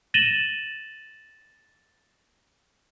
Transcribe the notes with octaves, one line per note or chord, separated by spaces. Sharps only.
A6 A#6 D#7 E7 F#7 G7